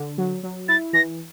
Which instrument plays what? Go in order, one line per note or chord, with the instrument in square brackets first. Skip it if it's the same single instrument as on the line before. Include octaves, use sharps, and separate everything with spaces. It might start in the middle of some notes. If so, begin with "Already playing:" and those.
Already playing: [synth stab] D3
F#3
F#3
[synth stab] E4 [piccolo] A6
[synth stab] E3 [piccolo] A#6